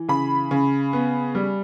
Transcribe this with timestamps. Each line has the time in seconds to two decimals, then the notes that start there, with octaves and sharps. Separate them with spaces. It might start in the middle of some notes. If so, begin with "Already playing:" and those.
Already playing: E3
0.08 C#3 B5
0.51 C#3
0.93 B3
1.35 G3